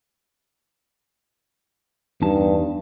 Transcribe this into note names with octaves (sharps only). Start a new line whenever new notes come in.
E2 G2 D#4 A5